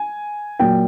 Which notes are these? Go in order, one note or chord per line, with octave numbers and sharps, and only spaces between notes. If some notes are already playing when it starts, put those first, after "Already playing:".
Already playing: G#5
A#2 F#3 A#3 G5